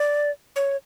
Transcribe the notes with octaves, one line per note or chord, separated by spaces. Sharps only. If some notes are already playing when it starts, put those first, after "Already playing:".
Already playing: D5
C#5